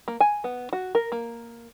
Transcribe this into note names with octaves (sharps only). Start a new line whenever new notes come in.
A#3
G#5
B3
F#4
A#4
A#3